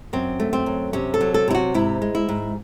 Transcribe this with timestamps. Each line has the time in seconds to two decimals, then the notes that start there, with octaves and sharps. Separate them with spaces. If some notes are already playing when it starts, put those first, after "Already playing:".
0.13 F#2 C4
0.40 A3
0.53 C4
0.66 F#2
0.93 C3 C#4
1.14 A4
1.21 F#3
1.34 A4
1.48 C3 E4
1.55 F#4
1.74 G#2 E4
2.02 G#3
2.15 E4
2.29 G#2